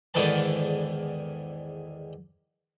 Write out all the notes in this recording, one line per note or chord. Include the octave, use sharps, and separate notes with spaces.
E2 G#2 D3 D#3 B4 A5